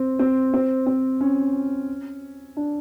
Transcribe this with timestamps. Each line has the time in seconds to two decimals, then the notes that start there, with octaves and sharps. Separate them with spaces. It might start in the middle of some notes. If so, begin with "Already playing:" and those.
Already playing: C4
0.19 C4
0.54 C4
0.87 C4
1.21 C#4
2.57 D4